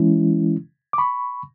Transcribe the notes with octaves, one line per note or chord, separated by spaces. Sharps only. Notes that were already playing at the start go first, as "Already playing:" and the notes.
Already playing: E3 G#3 C#4 E4
D6
B5 C#6